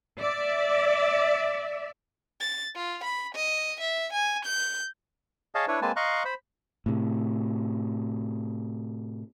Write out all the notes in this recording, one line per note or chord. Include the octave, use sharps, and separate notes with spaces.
D5 E5
A6
F4
B5
D#5
E5
G#5
G6
G#4 C#5 D#5 F5 A5
D4 E4 B4 C#5
G#3 A#3 C4 B4 G#5 A5
D#5 F5 A#5 C6 C#6 F#6
C5 B5
A2 C3